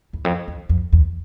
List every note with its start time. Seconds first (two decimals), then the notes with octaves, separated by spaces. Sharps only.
0.13 E2
0.25 F2
0.48 E2
0.69 F2
0.93 E2